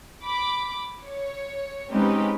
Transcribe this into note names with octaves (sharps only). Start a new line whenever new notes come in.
B5 D6
C#5
G#3 C4 C#4 D#4 G4 B4